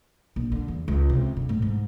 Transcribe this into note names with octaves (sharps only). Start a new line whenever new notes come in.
A#1
D3
E2
C#2
C3
D3
A2
G#2